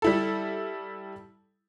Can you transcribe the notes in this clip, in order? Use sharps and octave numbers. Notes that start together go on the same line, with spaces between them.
G3 E4 A4